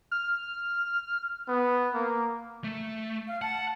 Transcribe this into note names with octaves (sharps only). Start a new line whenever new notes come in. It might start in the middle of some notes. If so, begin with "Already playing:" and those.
F6
B3
A#3
A3
F5
F#5 A5